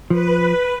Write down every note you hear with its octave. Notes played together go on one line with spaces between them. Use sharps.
F3 B4